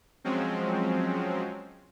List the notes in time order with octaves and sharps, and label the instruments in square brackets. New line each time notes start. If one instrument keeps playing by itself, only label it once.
[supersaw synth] F3 F#3 G#3 C4 C#4